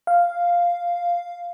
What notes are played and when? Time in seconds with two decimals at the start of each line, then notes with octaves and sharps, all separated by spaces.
0.07 F5